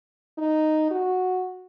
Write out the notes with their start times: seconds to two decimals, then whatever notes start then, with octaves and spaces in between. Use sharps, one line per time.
0.38 D#4
0.91 F#4